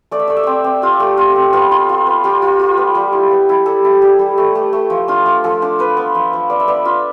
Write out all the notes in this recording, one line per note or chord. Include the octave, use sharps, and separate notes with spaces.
A3 D5
E5
A3 D5
E5
C4 D5
C4
F4 G4
A3
F4
C4
B3 F4
F4
F4
B3
F4 G4
F4
F4
B3
G3
E4
B3
E4
G3 A4
E4
G3
G3
A3
A3
A3
F3
D4 F4
F3
F3 A4
D4
F4 B4
B3
F3
F3
B3 D5
E5
B3 D5
F4 E5